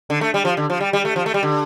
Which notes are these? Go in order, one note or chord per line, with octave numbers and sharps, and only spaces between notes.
D3
A3
G3
F3
D3
F3
G3
G3
A3
F3
A3
G3
D3